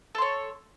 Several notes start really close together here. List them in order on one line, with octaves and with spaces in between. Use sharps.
A4 C6 C#5